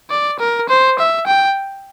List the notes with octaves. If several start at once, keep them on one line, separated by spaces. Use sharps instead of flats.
D5
A#4
C5
E5
G5